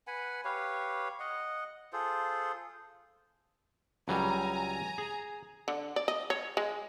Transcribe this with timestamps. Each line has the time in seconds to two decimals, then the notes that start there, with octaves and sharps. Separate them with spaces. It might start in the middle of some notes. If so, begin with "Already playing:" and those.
0.07 B4 F#5 G#5 B5
0.45 G4 B4 C#5 F5
1.20 D#5 F#5
1.93 F4 G#4 A4 C5
4.08 C#2 F#3 G3 G#5 A#5
4.98 G#4
5.68 D3
5.96 D5
6.08 D#5
6.30 C#5
6.57 G#3